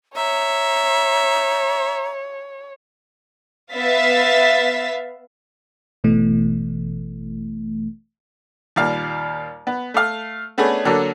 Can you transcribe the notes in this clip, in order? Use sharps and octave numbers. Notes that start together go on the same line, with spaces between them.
C#5 E5 A#5
B3 E5 F5 A6 B6
G#1 B2 E3 A3
D#2 A#2 G3 F5
B3
A3 F5
A3 B3 C#4 D4 G#4
D3 F#3 A#3 A4